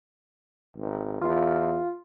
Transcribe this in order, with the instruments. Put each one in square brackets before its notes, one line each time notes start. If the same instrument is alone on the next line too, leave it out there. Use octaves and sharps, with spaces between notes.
[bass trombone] G#1
[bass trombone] E2 [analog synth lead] F4